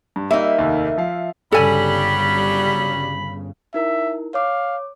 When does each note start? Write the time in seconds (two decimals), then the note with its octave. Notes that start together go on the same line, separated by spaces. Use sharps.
0.16 G2
0.31 G3 A#3 D#4 E5
0.58 F1 D#2
0.98 F3 F5
1.52 G1 C#3 F#3 G3 A4 G#5 B5
3.74 D#4 E4 A#4 E5
4.34 C#5 F5 D6